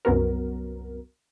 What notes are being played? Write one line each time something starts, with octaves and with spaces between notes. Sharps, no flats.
C2 F#2 F#3 B3 F#4 A#4